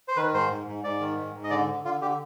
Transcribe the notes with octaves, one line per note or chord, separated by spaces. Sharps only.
C5
D#3 B4
G#2 C5
G#2
G#2
G#2 D5
D#3
G#2
G#2
D#5
D3 D5
D3
D3 F4
D3 G4